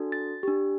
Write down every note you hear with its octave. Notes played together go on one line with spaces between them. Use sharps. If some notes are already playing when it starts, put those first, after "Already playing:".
Already playing: D4 F#4 A4
A6
D4 G4